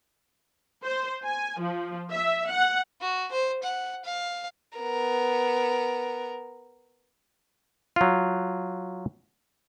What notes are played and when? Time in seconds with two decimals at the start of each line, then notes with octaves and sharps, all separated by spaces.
0.85 C5
1.24 G#5
1.60 F3
2.11 E5
2.49 F#5
3.02 F#4
3.32 C5
3.63 F#5
4.04 F5
4.78 B3 A#4
7.96 F#3 F4